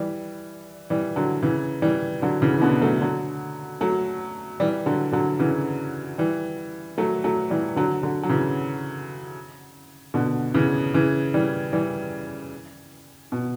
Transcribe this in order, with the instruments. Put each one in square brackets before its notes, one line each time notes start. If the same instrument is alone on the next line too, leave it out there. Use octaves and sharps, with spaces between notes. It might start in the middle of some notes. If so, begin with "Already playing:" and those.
Already playing: [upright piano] E3 G3
E3 G3
D3 F#3
C#3 E3
E3 G3
D3 F#3
C#3 E3
E3
B2 D3
F#3 A3
D3 F#3
F#3 A3
E3 G3
D3 F#3
D3 F#3
C#3 E3
E3 G3
F#3 A3
F#3 A3
E3 G3
D3 F#3
D3 F#3
F#3
C#3 E3
B2 D3
C#3 E3
C#3 E3
E3 G3
E3 G3
B2